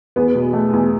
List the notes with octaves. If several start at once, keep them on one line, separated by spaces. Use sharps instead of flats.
E2 B3
B2
A3
E2